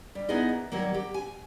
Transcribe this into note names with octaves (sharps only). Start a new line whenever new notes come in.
G3
B3 D#4 E4 G#4 D#5
D#2
D#3 F#3 G3 A#3
G4
G#5